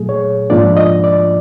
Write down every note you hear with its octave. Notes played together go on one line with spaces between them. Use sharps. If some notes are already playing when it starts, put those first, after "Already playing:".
Already playing: A#2 F#3 A3 G#4
C#5
G#2 F3 A#3 D4 F4 D5
D#5
D5